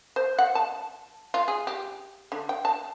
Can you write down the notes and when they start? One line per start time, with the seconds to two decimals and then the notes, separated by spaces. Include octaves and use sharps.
0.16 C5
0.38 F#5
0.55 A5
1.34 F4
1.48 G#4
1.67 G4
2.32 D3
2.49 G5
2.65 A5